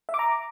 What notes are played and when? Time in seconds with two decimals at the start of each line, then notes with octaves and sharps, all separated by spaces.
0.09 E5
0.14 D6
0.19 A#5